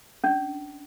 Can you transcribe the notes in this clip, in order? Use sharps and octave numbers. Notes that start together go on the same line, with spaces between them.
C#4 D4